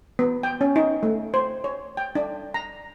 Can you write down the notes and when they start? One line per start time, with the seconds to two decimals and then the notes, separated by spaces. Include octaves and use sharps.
0.19 B3
0.43 G5
0.61 C#4
0.76 D#4
1.03 A3
1.34 C5
1.64 C#5
1.97 G5
2.15 D4
2.54 A#5